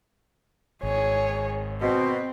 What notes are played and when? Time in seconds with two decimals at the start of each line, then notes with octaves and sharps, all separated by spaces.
0.83 G#1 G#4 C#5
1.82 B2 C4